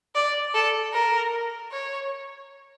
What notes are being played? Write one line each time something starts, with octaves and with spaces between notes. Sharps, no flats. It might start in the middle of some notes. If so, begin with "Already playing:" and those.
D5
A4
A#4
C#5